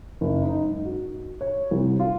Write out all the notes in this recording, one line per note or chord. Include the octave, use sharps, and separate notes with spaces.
F#1
D#4
G#2
F#4
C#5
C2
F4